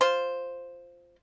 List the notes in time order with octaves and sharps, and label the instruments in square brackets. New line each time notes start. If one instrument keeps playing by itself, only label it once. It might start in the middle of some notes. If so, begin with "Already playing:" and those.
[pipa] F4 C5